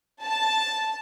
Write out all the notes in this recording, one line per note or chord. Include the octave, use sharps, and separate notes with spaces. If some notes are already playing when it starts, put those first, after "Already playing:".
A5